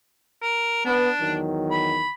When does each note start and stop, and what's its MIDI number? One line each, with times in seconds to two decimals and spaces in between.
0.42 0.84 70
0.85 1.07 59
0.85 1.37 62
1.20 2.04 40
1.20 2.04 51
1.20 2.04 54
1.71 2.11 83